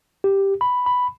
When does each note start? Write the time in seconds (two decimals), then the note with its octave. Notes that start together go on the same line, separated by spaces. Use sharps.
0.24 G4
0.61 B5
0.86 B5